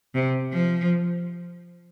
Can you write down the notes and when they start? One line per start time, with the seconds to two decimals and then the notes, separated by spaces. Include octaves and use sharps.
0.15 C3
0.51 F3